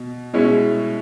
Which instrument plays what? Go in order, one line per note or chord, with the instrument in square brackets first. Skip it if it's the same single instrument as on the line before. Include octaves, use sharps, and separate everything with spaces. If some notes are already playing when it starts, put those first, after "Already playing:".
Already playing: [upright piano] B2
B2 G#3 C#4 E4